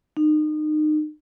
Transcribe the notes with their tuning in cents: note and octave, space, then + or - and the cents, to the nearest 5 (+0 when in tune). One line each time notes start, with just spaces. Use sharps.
D#4 -30